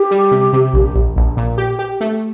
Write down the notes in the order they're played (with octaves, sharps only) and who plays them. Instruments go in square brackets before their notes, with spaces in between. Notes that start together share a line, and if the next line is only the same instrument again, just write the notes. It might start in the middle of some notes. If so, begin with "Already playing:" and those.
Already playing: [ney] G4
[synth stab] G3
C3
C3
A#1
A#1
A#1
A#2
G4
G4
A3